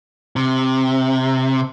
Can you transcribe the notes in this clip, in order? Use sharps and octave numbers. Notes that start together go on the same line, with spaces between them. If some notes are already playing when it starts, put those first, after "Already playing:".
C3